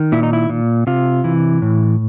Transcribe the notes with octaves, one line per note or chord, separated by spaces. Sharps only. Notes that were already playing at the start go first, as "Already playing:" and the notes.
Already playing: D#3
A#2 E4
D#4
E4
A#2
C3 F4
E3
A2